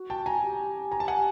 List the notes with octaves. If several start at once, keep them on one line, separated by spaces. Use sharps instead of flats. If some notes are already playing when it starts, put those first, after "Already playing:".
Already playing: F#4
G5 A5
G#5 A#5
G4
G#5 A#5
A5
F#5 G#5